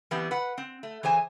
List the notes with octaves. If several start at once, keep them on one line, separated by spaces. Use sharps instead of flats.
E3 G3 B3 C4
B4 F#5
C4
A3
E3 G#4 C5 G#5